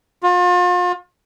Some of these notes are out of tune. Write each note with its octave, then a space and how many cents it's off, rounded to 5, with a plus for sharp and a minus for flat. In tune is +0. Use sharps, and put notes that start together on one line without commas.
F4 +40